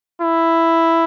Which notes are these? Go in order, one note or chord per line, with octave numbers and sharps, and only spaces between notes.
E4